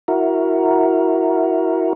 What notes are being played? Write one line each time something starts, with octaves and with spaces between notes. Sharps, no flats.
E4 F#4 A#4